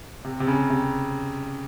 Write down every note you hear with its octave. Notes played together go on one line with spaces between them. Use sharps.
C3
C3
C#3
C3